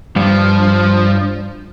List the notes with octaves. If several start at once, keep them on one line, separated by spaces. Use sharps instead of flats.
G2 F3